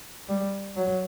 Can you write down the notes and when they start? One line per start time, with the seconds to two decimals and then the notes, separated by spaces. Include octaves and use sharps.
0.29 G3
0.76 F#3